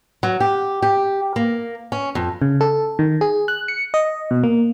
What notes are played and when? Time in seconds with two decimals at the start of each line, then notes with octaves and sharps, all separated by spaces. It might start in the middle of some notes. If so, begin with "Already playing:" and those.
0.23 F#3
0.40 G4
0.82 G4
1.36 A#3
1.92 C#4
2.15 F2
2.42 C#3
2.61 A4
2.99 D#3
3.21 G#4
3.48 F#6
3.68 C#7
3.94 D#5
4.31 B2
4.44 A#3